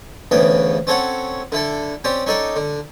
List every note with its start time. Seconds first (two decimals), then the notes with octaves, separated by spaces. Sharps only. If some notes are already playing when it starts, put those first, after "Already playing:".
0.31 D2 C#3 E3 B3 G5
0.87 C4 C#4 A4 C#5 F#5
1.52 D3 E4 A4
2.04 C4 C#4 G4 D5
2.26 C#4 D#4 A4 D5 G5
2.56 D3